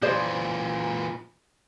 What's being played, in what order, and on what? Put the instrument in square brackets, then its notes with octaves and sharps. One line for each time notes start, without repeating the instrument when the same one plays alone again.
[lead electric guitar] A#2 E3 [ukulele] G#4 C5 D5